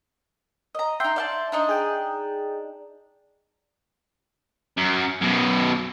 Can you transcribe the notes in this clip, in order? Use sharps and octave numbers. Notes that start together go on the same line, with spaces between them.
D#5 A#5
D#4 E5 G5 C6 G6
D5 F5 A5
D4 D#4 D#5
G#4 G5
F#2
F#2 B2